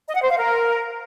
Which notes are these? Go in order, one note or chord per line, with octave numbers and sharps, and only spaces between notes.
D#5
F#5
C5
F5
A#4